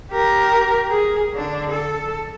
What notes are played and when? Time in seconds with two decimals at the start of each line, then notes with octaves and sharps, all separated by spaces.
0.12 G4 A#4
0.89 G#4
1.34 D3 D4
1.71 A4